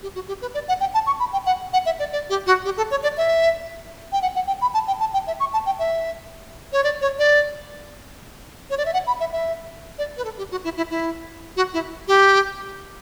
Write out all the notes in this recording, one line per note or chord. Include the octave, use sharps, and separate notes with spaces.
G4
F#4
G4
B4
D5
F#5
G5
A5
C#6
B5
G5
F#5
F#5
E5
D5
D5
G4
F#4
G4
A4
C#5
D5
E5
G5
F#5
F#5
G5
B5
A5
G5
A5
G5
E5
C#6
A5
G5
E5
C#5
D5
C#5
D5
C#5
D5
E5
F#5
B5
E5
E5
D5
B4
A4
G4
F#4
E4
E4
E4
F#4
E4
G4